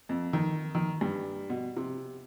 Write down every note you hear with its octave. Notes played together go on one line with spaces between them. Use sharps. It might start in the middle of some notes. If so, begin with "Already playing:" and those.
F2
D#3
D#3
G2
B2
C3